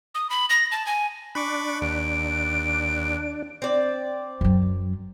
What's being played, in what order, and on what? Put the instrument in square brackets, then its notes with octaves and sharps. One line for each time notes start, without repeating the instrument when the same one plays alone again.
[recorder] D#6
B5
A#6
A5
G#5
[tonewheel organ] D4 [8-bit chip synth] B5 C#6 D6
[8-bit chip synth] D#2 [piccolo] D7
[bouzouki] C4 D5
[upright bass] F#2 F#3